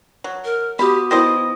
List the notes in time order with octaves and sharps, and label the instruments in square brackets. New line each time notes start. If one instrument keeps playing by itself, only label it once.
[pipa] F#3
[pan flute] A#4
[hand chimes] B3 F#4 D#6 [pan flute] G4 [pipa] B5
[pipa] D#3 C5 D#5 [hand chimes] B3 D#6 A#6 [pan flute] E4